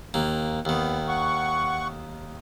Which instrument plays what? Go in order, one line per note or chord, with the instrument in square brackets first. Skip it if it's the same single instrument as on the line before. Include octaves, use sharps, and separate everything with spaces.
[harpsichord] D#2 A#3
[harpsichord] D#2 D#3 [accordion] B3
[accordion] F#5 C#6